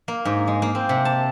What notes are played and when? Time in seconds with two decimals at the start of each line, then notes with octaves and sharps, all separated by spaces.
0.08 A#3
0.25 G#2
0.47 G#3
0.62 A#3
0.75 C4
0.89 C3
1.05 A5